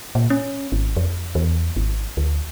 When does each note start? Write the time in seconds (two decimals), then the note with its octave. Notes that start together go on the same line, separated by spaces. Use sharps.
0.15 A#2
0.30 C#4
0.72 G#1
0.97 F2
1.35 E2
1.76 G#1
2.17 D2